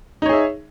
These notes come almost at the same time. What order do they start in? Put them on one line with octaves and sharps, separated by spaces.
D#4 C#5 G#4 E5